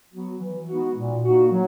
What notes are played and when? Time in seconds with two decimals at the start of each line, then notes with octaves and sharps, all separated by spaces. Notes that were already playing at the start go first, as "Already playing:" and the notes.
0.12 F#3 B3 F#4
0.39 E3
0.67 G#3 B3 D#4 F#4
0.96 A#2
1.24 A#3 D#4 F#4
1.51 F#3